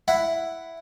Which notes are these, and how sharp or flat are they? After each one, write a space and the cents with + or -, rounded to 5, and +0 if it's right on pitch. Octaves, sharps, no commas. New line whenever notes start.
E4 +5 F#5 +0